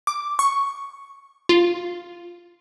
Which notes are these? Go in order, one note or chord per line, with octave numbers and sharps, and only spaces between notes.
D6
C#6
F4